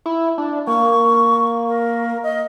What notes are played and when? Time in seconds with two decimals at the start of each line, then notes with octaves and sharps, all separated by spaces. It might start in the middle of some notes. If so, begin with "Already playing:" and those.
0.06 E4
0.38 D4
0.67 A#3 C#6
1.68 A#4
2.23 D#5